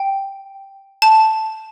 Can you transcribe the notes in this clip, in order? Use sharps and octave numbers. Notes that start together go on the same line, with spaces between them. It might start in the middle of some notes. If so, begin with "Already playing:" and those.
Already playing: G5
A5